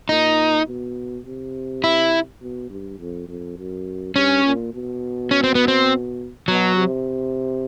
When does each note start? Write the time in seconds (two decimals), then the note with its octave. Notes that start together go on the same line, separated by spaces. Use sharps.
0.09 A#2 D#4
0.67 B2
1.26 C3
1.84 E4
2.42 B2
2.70 G2
2.99 F2
3.28 F2
3.58 F#2
4.15 G2 C#4
4.45 A#2
4.74 B2
5.31 C#4
5.44 C4
5.55 B3
5.68 C4
6.48 B2 F#3
6.76 C3